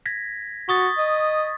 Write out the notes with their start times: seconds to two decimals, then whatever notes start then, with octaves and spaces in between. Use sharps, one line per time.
0.06 G#6 A#6 B6
0.69 F#4 C#6 D#6 A6
0.98 D#5